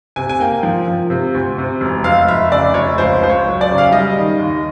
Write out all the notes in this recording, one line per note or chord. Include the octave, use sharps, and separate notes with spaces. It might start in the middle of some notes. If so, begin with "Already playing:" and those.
C3 G#5
G#5
A#3 G5
F3
F3
C3
D2
C3
E1
F1 F5
F1 E5
C#3 D5
F1 C#5
C#2 C5
C#2 C5
C#5
F#3
D5
C#3
F5
E5
G3 D#5
D#3
D#2